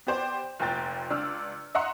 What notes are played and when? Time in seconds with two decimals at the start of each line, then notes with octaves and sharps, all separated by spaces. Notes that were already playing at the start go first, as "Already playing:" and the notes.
0.07 B3 G4 C5 D5 G5
0.59 F1 A#2 G5 A6
1.10 C#2 D4 E6 F6
1.75 D#5 E5 F#5 A#5 C6